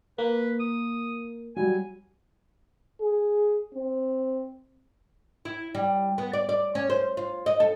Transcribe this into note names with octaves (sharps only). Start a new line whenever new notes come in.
A#3 B4
D#6
F#3 G3 G#5
G#4
C4
E4
G3
B3
D5
D5
C#4
C5
F4
D#5
A4